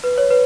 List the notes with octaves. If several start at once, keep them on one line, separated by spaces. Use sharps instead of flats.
B4
C#5
B4